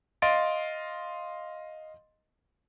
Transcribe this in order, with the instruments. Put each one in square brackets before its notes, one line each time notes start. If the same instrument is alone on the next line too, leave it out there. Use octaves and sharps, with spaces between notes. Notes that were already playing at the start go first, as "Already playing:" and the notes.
[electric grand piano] D#5 F5 C6 A6 D7